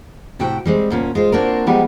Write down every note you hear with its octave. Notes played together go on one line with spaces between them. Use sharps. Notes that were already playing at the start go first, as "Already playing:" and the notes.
A2 C3 F#4 E5 G5
G3 G#3 C4
D2 A#2 C#4
G#3 F4 C5
A#3 C4 D4 F4 F#4 A#4
F3 G3 G#3 B3 D#4 G4